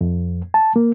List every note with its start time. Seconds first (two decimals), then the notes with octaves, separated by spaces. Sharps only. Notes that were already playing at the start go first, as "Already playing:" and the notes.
0.01 F2
0.54 A5
0.76 A#3